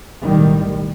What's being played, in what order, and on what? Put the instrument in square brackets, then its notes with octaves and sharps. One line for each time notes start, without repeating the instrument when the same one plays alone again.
[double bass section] B1 A2 D#3 G3